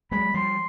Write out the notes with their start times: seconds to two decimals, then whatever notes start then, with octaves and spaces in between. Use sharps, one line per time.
0.11 F#3 G#3 B5
0.34 F3 G3 C6